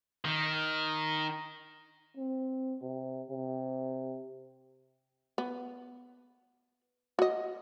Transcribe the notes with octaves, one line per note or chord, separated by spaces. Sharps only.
D#3
C4
C3
C3
B3
F#4 D#5